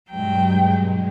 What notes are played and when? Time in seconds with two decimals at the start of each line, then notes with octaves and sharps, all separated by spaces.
0.11 G2 B2 F#3 G#3 G5